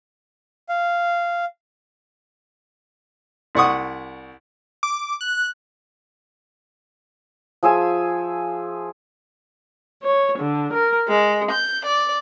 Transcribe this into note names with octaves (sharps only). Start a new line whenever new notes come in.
F5
C2 D5 F#5 C#6 D#6
D6
F#6
F3 G#4 E5 G#5
C#5
D3
A#4
G#3
G6
D5